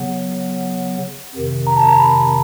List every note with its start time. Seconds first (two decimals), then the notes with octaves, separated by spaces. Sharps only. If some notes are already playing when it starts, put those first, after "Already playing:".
Already playing: C#3 F#3 B3 F#5
1.35 F2 C3 D#3
1.67 A#5
1.77 A5
1.87 A#5
1.98 B5